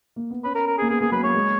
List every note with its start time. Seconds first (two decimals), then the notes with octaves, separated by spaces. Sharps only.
0.16 A#3
0.30 B3
0.44 C#4 B4
0.55 A#4
0.67 A#4
0.78 G#4
0.82 A#3
0.89 B3 G#4
1.01 A#3 G#4
1.12 F#3 B4
1.23 A#3 C#5
1.35 G#3